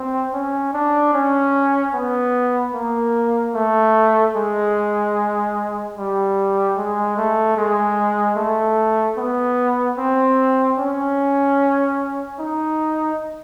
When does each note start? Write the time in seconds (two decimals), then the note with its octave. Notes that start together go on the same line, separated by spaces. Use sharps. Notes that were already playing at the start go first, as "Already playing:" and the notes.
Already playing: C4
0.33 C#4
0.74 D4
1.14 C#4
1.94 B3
2.74 A#3
3.55 A3
4.36 G#3
5.97 G3
6.77 G#3
7.17 A3
7.57 G#3
8.37 A3
9.17 B3
9.98 C4
10.79 C#4
12.40 D#4